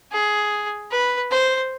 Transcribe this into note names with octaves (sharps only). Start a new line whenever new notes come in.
G#4
B4
C5